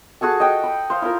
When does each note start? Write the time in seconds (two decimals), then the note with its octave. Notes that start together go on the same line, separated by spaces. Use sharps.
0.21 F#4 G#4 A4 A5
0.40 D#5 G5
0.63 B5
0.90 C5 F5
1.02 E4 F4 A#4